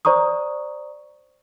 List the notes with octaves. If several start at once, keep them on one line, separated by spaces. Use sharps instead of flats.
C5 D5 A#5 C#6 D#6